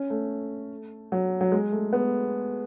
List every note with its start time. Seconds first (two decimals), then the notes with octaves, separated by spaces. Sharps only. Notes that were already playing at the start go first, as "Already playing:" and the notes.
Already playing: C#4
0.10 A3
1.12 F#3
1.41 F#3
1.52 G#3
1.72 A3
1.93 B3